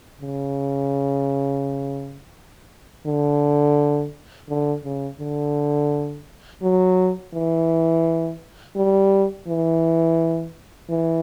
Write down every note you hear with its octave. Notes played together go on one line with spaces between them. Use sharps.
C#3
D3
D3
C#3
D3
F#3
E3
G3
E3
E3